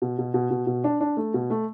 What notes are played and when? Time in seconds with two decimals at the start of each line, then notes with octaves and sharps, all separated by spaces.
0.02 B2
0.19 B2
0.34 B2
0.51 B2
0.67 B2
0.84 D4
1.01 D4
1.17 A3
1.34 B2
1.50 A3